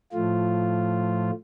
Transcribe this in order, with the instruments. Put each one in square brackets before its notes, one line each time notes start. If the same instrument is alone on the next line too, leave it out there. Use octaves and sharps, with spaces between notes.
[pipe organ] A2 F3 A3 F4